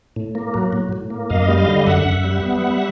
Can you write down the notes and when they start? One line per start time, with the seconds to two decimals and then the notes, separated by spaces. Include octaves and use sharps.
0.16 A2
0.35 A#3
0.54 F#3
0.73 A2
0.93 A2
1.10 A#3
1.30 F#2 D#5 F5
1.48 G3
1.58 D#5 F5
1.67 D3
1.86 F#2 E5 F#5
2.05 F#2
2.24 G3
2.43 B3
2.62 G3